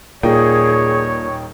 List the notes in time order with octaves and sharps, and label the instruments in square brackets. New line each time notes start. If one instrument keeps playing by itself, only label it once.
[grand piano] D#1 D#4 G5 [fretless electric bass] A#2 [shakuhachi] G#4 [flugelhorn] C#5